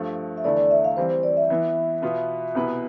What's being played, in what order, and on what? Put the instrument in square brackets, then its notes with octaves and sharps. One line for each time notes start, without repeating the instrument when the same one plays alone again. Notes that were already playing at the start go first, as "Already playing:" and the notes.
Already playing: [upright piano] G2 F3 A3
[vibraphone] E5
[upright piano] E2 D3 A3 E4 [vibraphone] D5
[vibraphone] D5
E5
F5
[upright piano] E3 G3 C4 [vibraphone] C5
[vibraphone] C5
D5
E5
[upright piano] E3 B3 E4
B2 B3 F4 B4
C2 B2 B3 E4 B4